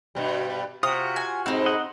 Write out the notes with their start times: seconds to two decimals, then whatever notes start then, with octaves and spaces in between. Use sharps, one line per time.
0.15 G2 B2 G3
0.83 C3 F4 F#4 D#6
1.16 G#5
1.46 G#2 B2 C4 D#4
1.66 D#5 F#5